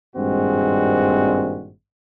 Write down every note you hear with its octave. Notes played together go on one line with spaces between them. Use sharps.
G#1 G2 A#2 G#3 C4 F#4